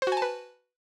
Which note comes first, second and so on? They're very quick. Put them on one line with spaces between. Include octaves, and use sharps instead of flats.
C5 F#4 G#5 A5 B4